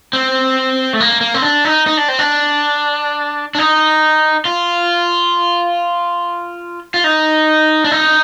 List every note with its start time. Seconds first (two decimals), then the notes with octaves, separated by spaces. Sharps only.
0.13 C4
0.93 A3
1.00 A#3
1.21 A#3
1.34 C4
1.42 D4
1.65 D#4
1.87 D#4
1.97 D4
2.08 C4
2.19 D4
3.55 D4
3.58 D#4
4.45 F4
6.94 F4
7.04 D#4
7.85 D4
7.91 D#4